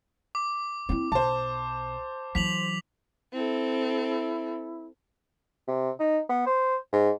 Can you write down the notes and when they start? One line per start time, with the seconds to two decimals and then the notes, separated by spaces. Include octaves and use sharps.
0.35 D6
0.89 C4 E4
1.12 B1 C5 A5
2.35 E3 F#3 B6 F7 F#7
3.33 C4 E4 A4
5.68 C3
5.99 D#4
6.29 B3
6.46 C5
6.93 G#2